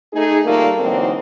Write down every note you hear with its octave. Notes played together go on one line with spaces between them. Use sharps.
A3 D#4 G#4
A#2 D#3 G3 A3 A#3
D3 E3 F#3 A#3 C4 D#4